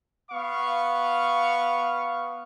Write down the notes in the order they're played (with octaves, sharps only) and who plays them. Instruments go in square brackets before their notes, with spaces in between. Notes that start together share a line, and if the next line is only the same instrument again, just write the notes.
[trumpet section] B3 F5 C#6